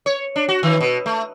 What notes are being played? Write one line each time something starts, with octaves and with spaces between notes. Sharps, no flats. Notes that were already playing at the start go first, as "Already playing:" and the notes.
C#5
D4
F#4
D#3
B2
A3